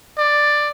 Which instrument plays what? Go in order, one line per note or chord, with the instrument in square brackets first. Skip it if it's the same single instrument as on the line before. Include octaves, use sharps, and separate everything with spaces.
[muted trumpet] D5